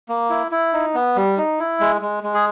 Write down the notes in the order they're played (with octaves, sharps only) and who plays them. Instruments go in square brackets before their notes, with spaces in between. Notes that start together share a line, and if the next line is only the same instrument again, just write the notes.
[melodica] A#3
E4
E4
D#4
B3
G3
D#4
E4
G#3
G#3
G#3
G#4